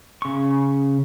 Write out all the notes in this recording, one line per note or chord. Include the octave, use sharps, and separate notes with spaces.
C#3 C#6